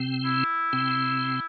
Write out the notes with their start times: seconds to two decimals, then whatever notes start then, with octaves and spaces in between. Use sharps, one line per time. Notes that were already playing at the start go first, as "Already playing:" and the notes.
Already playing: C3 C4
0.25 E4
0.73 C3 C4